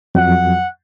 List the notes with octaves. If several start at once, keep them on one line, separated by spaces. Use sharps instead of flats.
F2 F#3 F#5